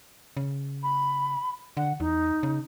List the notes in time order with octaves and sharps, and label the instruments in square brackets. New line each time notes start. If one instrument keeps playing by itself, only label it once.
[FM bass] C#3
[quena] B5
[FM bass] D3 [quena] F#5
[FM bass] E2 [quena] D#4
[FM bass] C#3